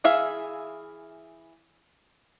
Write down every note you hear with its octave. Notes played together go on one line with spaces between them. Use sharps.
E3 G#4 E5 F5